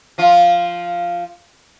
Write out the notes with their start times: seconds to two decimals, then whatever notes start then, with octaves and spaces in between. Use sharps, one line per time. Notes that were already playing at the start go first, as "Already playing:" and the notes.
0.18 F3 F4